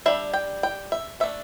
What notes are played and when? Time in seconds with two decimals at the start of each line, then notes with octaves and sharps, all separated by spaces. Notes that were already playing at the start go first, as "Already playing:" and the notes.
0.06 G3 D4 E5
0.34 G5
0.63 G5
0.92 E5
1.20 A3 D4 E5